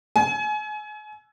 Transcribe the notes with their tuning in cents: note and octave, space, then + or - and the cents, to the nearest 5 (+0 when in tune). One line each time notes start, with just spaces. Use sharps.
G#5 +30